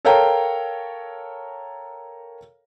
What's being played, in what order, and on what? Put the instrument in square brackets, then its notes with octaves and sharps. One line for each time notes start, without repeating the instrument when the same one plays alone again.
[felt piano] A4 A#4 C#5 F5 G5 A#5